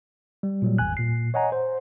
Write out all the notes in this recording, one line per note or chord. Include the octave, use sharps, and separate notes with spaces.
G3
A#2 F#3 G3
G#1 E2 G#5 F#6
A#2 C7
C#5 D#5 F#5 G#5 A#5
C5